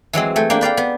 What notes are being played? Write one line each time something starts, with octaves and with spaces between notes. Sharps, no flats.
E3 F#3 G#3 C4
A3 G5 G#5
A#3 D4 G5
B4 D5 F5 G5
B3